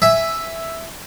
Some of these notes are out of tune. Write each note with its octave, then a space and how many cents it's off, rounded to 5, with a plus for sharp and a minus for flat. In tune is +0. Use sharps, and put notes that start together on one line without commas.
E5 +0 G#5 +0